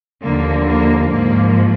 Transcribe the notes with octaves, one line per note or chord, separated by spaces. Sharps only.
D#2 D3 F3 A#3
A#3
G#2 F3 A#3